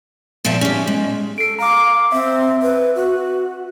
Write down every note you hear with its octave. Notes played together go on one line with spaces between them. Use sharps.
E2 A#2 F3 E5 A5
C#4 G4
G#3
A4 C7 D7
F5 A#5 D6
C4 E5
B4
F#4